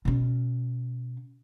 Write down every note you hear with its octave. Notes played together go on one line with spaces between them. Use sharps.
B2 C#4